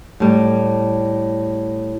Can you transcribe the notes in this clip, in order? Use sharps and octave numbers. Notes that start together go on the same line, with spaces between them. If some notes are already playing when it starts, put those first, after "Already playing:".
A2 G3